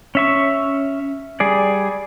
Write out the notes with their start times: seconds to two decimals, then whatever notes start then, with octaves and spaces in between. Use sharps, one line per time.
0.15 C#4 E5 C#6
1.40 G3 G#4 D5